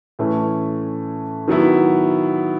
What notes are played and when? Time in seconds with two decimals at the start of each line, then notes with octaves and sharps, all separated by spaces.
0.19 A2 E3 A3 C#4
1.48 D#3 F#3 B3 E4